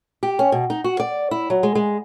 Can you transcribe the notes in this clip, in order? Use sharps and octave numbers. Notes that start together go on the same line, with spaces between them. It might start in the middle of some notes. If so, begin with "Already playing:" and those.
G4
C#4
B2
D#4
F#4
D5
E4
F#3
G#3
G#3